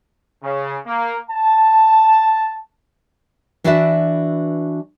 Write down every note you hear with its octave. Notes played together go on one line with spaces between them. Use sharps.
C#3
A#3
A5
E3 D4 F#4 B4 D5 E5